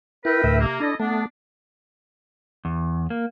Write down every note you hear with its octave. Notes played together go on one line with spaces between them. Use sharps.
E4 A#4 B4 G5
D2 A2 E5
C3 A#3
D4 E4 A4 D#5
A3 B3 D4
E2
A#3